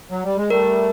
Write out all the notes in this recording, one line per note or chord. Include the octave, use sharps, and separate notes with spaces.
F#3
G3
G#3
G3 A3 A#4